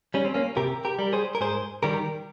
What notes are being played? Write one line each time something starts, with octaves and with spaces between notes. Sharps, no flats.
G3 C#4
C4
A#3 C#4
C3 G4 A#4
G4 A#4
G3
G#4 C5
A#4
G#2 G#4 C5
D#3 G3 G4 A#4